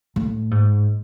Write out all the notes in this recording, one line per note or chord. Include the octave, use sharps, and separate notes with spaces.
A2
G#2